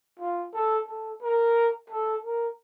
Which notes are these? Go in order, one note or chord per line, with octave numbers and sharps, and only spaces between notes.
F4
A4
A4
A#4
A4
A#4